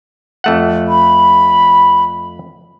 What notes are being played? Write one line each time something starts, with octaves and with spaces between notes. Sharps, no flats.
F2 A3 F#5
B5